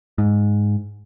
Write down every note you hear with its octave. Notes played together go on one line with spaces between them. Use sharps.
G#2